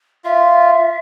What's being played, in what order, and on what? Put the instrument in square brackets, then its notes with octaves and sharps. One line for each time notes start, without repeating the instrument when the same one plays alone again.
[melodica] F4 [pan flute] E5